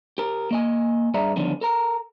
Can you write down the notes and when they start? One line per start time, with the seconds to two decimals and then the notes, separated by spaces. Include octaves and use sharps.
0.18 G4 A#4
0.51 A#3 D#5 G#5
1.14 G2 G#4 D5 E5 A#5
1.36 E2 D3 D#3 F3 G3 C#4
1.61 A4 A#4 A#5